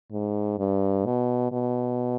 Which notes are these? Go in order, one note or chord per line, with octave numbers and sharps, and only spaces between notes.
G#2
G2
B2
B2